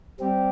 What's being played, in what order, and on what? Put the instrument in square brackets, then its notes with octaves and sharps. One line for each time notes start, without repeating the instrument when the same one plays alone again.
[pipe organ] G3 C4 G4